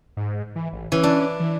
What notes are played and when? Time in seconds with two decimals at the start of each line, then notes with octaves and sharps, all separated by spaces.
0.17 G#2
0.56 E3
0.73 A1
0.92 E3 C#4
1.04 D4
1.40 E3